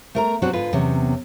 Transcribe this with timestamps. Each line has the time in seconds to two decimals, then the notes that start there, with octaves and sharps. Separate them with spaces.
0.15 A3 A#4 A#5
0.42 B2 F#3 C4 D4 F#4 G4
0.53 G#2 D3 F4 B4
0.73 E2 C3 F#3 C#4